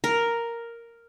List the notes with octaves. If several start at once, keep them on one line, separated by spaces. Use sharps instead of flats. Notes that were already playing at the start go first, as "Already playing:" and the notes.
A#4